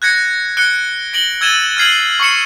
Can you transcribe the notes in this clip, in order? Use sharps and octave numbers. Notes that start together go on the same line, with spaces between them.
F#6 G#6 A#6 C#7
F#6 C#7 D7 G7
A#6 D7 F#7 G7
E6 G#6 A6 D#7 E7 G7
F6 G#6 C7 F#7
C#6 C7 C#7 E7